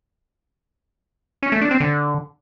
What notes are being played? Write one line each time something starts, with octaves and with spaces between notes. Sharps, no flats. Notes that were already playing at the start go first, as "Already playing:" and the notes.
C#4
A3
D4
C4
D3